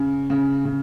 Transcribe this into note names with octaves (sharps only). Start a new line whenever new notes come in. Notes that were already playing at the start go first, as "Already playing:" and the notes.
Already playing: C#3
C#3
C#3